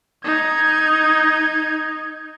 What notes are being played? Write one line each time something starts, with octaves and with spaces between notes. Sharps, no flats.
D#4 G#6